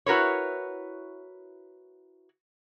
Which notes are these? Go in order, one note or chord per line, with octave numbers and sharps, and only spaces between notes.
E4 F#4 A#4 B4 C#5